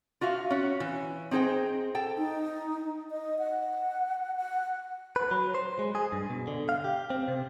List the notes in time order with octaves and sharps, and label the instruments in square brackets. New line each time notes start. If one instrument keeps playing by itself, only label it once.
[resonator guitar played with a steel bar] F4 F#4 E5 F5
C#4 F#4
E3
C4 D#4 G#4 C5 G5
A4 G5
[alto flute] D#4
D#5
F#5
F#5
[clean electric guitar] B4
F#3
C5
G#3
G#4
G2
B2
D3
F5
G4
C4
C3